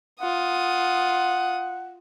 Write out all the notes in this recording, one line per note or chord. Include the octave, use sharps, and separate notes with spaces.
F4 F#5 D#6